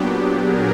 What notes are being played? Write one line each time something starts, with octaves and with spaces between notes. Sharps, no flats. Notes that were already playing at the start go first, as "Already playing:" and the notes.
Already playing: A#2 F#3 B3 D4 G4
G#4 A#4